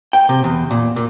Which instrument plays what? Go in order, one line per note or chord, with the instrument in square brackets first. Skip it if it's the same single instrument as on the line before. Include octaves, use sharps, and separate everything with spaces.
[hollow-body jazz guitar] G5
C3
E2
A#2
A#2